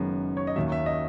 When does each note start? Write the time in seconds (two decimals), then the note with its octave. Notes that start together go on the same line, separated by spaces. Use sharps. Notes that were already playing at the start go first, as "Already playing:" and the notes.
Already playing: F#1 F#2 D#3 G#3 B3
0.37 C#5
0.47 D#5
0.56 D#2 D#3 F#3 E5
0.72 E5
0.86 D#5